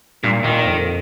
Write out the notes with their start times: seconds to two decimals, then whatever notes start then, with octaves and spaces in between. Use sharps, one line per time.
0.24 G2 A#2
0.44 A#2 D#3
0.66 F2